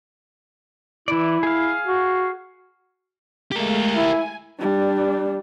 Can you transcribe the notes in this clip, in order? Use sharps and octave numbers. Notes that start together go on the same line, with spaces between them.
E3 E4 D5
G#4 F5
F#4
G#3 A3 G4 A#4 F5
E4 G#5
G3 D4